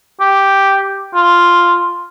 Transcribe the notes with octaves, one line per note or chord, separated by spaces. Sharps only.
G4
F4